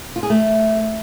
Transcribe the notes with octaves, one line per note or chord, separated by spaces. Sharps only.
F4
G#4
A3